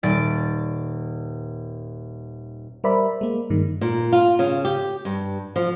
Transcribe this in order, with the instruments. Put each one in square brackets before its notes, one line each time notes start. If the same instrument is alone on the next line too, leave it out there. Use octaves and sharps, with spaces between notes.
[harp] D#1 D5 A6 D7
[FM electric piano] G3 A#4 C5 D5 E5 B5
G#3 A#3
G2 D#3 G#3
[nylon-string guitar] A#2
F4
C#3
G4
G2
F3